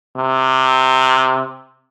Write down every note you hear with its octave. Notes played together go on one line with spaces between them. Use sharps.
C3